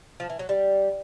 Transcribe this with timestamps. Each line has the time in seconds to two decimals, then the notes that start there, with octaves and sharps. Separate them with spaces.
0.20 F3
0.30 E3
0.39 F#3
0.49 G3